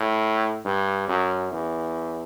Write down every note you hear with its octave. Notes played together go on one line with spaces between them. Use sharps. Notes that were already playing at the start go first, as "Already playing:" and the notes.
Already playing: A2
G2
F#2
E2